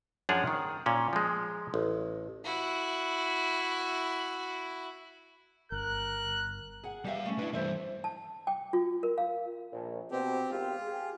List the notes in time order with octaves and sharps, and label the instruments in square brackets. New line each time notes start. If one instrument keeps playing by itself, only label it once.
[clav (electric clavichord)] F#2 F3 D4 G#4 C#5 F#5
D#3
A#2 C#4
F3 G#3
A1
[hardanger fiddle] E4 F#4
[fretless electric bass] G1 [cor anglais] A#4 [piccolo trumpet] F#6
[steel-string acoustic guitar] G#4 F#5
[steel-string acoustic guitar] E2 G4 E5 [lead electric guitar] G3 F5
[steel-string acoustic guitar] A3 C#4
[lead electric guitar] G3 B4 [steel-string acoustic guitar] D4 E4
[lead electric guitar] G2 E3 [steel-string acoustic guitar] A4 C5 E5
[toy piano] A5
G5
F4
A#4
F5
[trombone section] A#1
[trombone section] B2 [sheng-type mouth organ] C4 G4
[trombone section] G#1 G4 [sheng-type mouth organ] F4
[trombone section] G4 G#4